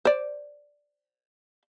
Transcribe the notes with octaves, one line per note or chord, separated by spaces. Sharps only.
C5 D5